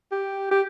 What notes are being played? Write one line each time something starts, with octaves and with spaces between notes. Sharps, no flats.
G4
G4